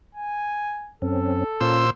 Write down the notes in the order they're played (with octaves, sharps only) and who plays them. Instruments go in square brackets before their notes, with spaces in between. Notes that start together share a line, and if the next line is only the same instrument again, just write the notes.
[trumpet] G#5
[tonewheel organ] F#2 C4 C#4 [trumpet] A4
[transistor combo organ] A#2 C5 E6 [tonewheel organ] C#4 F4